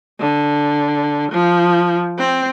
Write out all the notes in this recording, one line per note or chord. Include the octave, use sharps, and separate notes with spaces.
D3
F3
C4